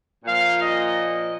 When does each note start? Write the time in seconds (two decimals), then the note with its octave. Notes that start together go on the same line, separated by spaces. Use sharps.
0.25 A#2 F3 F5
0.61 D#5